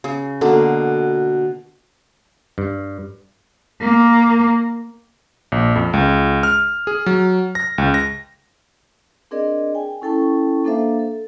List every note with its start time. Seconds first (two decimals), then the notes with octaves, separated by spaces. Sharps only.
0.04 C#3
0.41 B2 D3 A#3 A4
2.58 G2
3.80 A#3
5.52 A#1
5.76 F2
5.93 C#2
6.43 F6
6.87 G#4
7.06 F#3
7.55 A#6
7.78 C#2
7.94 A#6
9.31 C4 D4 G#4 A#4 D5 D#5
9.75 G5 G#5
10.02 C#4 E4 A4 G5 A5 C#6
10.65 A#3 D4 A4 C5 E5 F5
10.99 A4